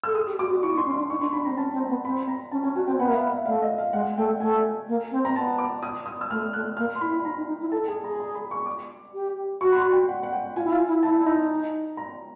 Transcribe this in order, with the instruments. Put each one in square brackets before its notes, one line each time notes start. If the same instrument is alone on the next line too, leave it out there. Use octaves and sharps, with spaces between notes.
[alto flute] A4 [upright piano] E6
[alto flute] G#4 [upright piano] D#6
[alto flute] G4
[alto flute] F#4 [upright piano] D6
[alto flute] F#4
[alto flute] E4 [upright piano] C#6
[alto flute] D#4
[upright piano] C6
[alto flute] C#4
[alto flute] D4 [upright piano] C6
[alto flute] D#4 [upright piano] C#6
[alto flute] D4 [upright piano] C6
[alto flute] D4 [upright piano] B5
[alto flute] C4 [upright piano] A#5
[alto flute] C#4 [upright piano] A5
[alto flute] C4
[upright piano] A#5
[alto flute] B3
[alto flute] C4 [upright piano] B5
[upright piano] A#5
[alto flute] C#4 [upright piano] A5
[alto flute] C#4 [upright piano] G#5
[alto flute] F#4 [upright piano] G#5
[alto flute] C4 [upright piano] G5
[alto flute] B3 [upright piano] F#5
[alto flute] A#3 [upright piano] E5
[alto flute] B3 [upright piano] F5
[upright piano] E5
[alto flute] A3 [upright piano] F5
[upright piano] D#5
F5
[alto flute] G#3 [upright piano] F#5
[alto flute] A3 [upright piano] G5
[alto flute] A3 [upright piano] G#5
[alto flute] A#3
C4
[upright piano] A#5
[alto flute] B3 [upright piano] A5
[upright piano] D6
D#6
D#6
E6
[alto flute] A3 [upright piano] F6
[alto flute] A3 [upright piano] F#6
[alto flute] A#3 [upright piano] F6
[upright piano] C6
[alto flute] E4 [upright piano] B5
[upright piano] B5
[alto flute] D#4 [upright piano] A#5
[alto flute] D#4
D#4
E4
[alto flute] A4 [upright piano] A5
[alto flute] G#4 [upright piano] G#5
[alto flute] G#4 [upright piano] A#5
[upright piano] A#5
B5
C#6
D6
[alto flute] G4
[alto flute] F#4 [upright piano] C#6
[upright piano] B5
C6
G5
F#5
F#5
G5
[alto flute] F4 [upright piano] G#5
[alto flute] E4
F4
E4
[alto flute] E4 [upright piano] A5
[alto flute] E4
[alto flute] D#4 [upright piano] A#5
[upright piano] A#5